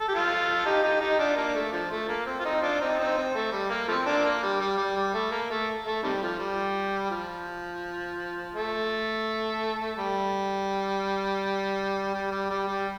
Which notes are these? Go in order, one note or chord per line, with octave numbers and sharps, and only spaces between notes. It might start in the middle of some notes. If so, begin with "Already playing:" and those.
A4
G4
F4 A4
D#4 G4
D#4 G4
D#4 G4
D4 F4
A#3 D4
A3
D3 F3
A3
A#3
C4
F4
C4 D#4
D4 F4
C4 D#4
C4 D#4
C4
A3
G3
A#3
F3 A3 C4
A#3 D4
A#3
G3
G3
G3
G3
A3
A#3
A3
A3
C3 D#3 G3
F3
G3
F3
A3
G3
G3
G3
G3
G3